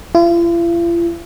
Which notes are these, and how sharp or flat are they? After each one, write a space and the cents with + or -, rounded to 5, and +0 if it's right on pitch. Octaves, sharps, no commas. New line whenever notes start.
F4 -45